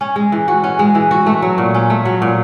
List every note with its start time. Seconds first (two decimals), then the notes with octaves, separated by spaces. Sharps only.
0.01 C#4
0.16 G#3
0.32 E3
0.48 F#4
0.64 C#4
0.79 G#3
0.95 E3
1.11 F#4
1.26 A3
1.42 F#3
1.58 A#2
1.74 C#4
1.90 A3
2.05 F#3
2.22 A#2